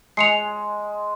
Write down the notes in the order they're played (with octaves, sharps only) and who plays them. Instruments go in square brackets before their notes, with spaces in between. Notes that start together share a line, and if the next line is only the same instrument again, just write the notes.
[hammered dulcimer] G#3 [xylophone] C7 C#7 F7